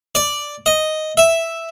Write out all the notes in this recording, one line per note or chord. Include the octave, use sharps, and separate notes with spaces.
D5
D#5
E5